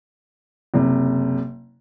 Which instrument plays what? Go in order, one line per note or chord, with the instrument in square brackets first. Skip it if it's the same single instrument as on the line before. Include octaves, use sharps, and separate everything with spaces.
[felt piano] F#1 C3